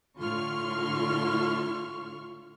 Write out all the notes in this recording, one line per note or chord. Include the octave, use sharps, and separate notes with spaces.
A2 D3 F4 C6 C#6 F6